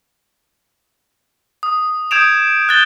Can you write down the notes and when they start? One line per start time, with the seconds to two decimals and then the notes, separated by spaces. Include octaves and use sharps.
1.63 D#6
2.11 D#6 G6 G#6 D7 E7 F7
2.69 F#6 G6 A6 G7